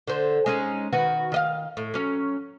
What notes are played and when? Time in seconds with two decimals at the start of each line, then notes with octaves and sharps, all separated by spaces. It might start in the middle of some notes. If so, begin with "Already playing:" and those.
0.07 D3 C5
0.46 G#3 C#4 D#4
0.93 D#3 F#4 B4
1.32 D#3 D#5 F5
1.77 A2
1.94 F#3 C#4